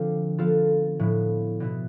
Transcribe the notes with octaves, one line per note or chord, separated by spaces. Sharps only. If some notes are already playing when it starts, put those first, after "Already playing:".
Already playing: D3 F3 C4 D4 F4
F3 B3 F4 A4
A2 F3 B3 E4
B2 B3 E4